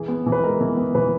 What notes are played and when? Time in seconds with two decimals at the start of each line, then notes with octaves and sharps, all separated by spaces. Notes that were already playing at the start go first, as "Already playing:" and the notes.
Already playing: E3 G#4
0.08 B3
0.26 E3
0.32 B4
0.44 G#3 A#4
0.61 E3
0.77 B3
0.95 E3 B4